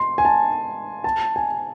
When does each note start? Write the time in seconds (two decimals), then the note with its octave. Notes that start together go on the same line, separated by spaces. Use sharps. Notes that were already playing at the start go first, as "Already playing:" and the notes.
Already playing: C6
0.18 G#5
0.25 A5
1.04 A5
1.36 G#5